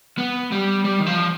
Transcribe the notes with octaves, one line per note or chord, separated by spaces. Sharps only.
B3
G3
G3
D#3
F3